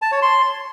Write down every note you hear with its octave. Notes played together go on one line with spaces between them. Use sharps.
A5
C#5
C6